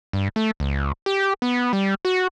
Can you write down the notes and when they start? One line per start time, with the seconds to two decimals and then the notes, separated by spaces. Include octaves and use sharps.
0.13 G2
0.36 A3
0.60 C#2
1.06 G4
1.42 B3
1.73 G3
2.05 F#4